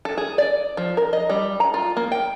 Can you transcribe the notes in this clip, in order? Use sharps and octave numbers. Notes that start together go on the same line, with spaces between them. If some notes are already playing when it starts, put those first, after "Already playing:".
A4
G#4
D5
F3
A#4
D#5
G3
A#5
F4
A#3
G5